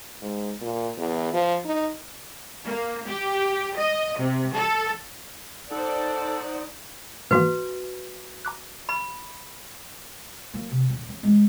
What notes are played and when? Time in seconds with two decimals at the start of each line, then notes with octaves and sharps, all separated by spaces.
0.21 G#2
0.61 A#2
0.98 E2
1.33 F3
1.65 D#4
2.64 A#3
3.08 G4
3.77 D#5
4.17 C3
4.54 A4
5.71 D#4 A4 C5 D5 F#5
7.31 G#2 E3 A#3 F#4 B4
8.45 A#5 D6 F#6
8.89 B5
10.54 F#3 A#3
10.71 C3
10.90 D#1 C#4
11.09 C#4
11.23 G#3 A3